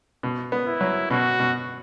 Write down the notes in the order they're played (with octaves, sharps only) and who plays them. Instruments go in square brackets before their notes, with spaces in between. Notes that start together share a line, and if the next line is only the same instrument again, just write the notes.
[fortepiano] B2
B3
[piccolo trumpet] E4
[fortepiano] F#3
[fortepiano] B2 [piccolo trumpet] F#4
[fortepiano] B2